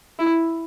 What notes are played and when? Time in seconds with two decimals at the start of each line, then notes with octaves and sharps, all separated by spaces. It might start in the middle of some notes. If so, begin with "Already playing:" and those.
0.19 E4